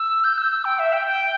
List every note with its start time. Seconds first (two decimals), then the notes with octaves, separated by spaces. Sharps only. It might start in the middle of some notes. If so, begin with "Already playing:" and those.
Already playing: E6
0.24 G6
0.38 E6
0.52 E6
0.65 G5
0.79 E5
0.93 G5
1.06 G5